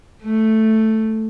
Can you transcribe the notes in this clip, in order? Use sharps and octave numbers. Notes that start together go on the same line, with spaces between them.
A3